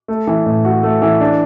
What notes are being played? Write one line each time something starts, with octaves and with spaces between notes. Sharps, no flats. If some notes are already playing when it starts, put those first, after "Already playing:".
A3
E3
A2
F#4
A3
E3
D4